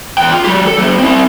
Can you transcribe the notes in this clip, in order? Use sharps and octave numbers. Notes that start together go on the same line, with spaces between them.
E2 G5
F4
F#3 G4
A4
F#3 A#3
C4 E4